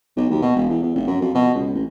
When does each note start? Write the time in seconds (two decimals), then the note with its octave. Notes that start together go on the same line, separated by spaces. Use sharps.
0.17 B1
0.30 D#2
0.42 B2
0.56 E1
0.70 E2
0.83 E2
0.95 F1
1.07 F#2
1.21 F2
1.35 B2
1.55 C#2
1.75 A1